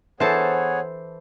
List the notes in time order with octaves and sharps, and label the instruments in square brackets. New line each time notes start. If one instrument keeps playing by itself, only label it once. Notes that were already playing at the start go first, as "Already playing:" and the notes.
[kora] E3 A4 [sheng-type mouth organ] B3 G#4 C#5 [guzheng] C5 A5